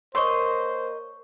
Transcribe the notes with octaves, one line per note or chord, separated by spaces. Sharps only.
A#3 A#4 C5 C#5 D#5 C6 C#6